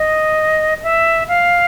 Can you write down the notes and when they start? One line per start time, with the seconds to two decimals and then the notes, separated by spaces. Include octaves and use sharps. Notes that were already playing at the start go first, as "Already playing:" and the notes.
Already playing: D#5
0.83 E5
1.28 F5